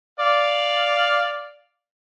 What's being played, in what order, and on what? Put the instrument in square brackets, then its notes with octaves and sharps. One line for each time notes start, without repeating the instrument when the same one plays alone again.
[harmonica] D5 F5